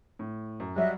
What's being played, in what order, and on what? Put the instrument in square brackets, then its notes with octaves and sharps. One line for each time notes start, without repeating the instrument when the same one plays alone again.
[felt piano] A2
F#2
[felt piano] F#3 G3 [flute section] D#5 E5 F#6